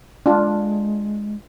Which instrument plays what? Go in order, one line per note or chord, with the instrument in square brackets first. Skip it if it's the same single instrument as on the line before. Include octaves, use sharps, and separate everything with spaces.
[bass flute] G#3 [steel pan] D4 F4